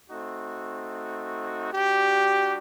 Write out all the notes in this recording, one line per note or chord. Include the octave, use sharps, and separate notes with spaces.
A3 C4 D#4 F#4
G3 D4 F#4 G4